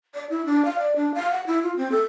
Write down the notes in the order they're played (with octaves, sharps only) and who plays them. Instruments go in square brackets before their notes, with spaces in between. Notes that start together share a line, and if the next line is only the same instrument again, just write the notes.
[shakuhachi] D5
E4
D4
F5
D5
D4
F5
F#5
E4
F4
C4
A4